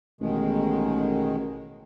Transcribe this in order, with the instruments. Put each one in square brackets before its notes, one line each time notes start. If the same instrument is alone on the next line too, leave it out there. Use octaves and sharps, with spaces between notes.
[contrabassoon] A1 [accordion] B2 D#3 G#3